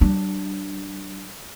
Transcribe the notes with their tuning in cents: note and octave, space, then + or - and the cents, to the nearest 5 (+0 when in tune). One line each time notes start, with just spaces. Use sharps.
G3 -45 D4 +5